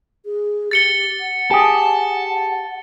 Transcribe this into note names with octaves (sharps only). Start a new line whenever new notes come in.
G#4
G4 A6 C#7 G7
F#5
G4 G#4 A5